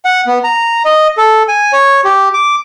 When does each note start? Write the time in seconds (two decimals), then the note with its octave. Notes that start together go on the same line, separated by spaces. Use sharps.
0.05 F#5
0.27 B3
0.44 A#5
0.85 D#5
1.17 A4
1.48 G#5
1.73 C#5
2.05 G4
2.34 D6